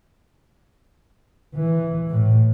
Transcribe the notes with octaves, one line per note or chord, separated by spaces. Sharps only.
E3
A2